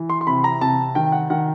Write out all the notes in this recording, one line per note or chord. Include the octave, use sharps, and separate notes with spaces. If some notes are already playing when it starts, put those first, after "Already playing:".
Already playing: E3
C6
C6
C3 B5
A#5
C3 A5
D#3 G5
F#5
D#3 F#5